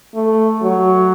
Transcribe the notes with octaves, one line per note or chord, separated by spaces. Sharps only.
A3
F#3